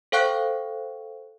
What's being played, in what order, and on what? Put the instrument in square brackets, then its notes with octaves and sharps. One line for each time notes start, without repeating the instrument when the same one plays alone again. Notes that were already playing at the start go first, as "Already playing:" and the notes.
[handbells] A4 C5 F5 G5 C#6 F#6